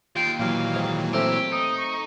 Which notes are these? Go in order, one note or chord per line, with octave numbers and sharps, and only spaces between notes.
D#2 F4 G5 C7 D7
A#2 E3 F#3 F5
G#2 D#3
A3 C4 G4 A#4 E6
D#4 D#6
C#6